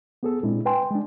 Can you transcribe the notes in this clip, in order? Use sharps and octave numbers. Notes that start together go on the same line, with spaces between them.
B3 G#4 A4
A#2 G#3 C4 D4 E4
B4 G5 G#5 C6
G#3 D4